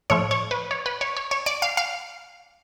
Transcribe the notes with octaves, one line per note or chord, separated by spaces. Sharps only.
A2 F3 A3 C#5
C#5
B4
C#5
B4
C#5
C#5
C#5
D5
F5
F5